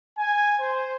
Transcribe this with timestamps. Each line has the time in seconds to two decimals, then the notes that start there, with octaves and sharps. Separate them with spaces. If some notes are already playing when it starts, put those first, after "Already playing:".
0.17 G#5
0.58 C5